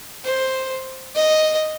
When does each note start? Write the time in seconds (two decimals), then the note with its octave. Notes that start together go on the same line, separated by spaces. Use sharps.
0.24 C5
1.15 D#5